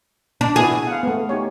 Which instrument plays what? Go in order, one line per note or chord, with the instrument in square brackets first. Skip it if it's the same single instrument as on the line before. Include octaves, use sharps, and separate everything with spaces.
[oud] D4
[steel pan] B3 E4 F#4 [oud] G#4
[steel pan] F5 F#5
A3 B3
D#4 G4 C#5